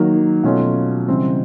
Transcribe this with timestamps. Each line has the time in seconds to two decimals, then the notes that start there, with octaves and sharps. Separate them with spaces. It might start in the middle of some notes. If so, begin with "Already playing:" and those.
Already playing: D#3 F#3 A#3 D#4
0.43 B2 F#3 A3 C#4 F4
1.08 C#3 E3 G3 C4 E4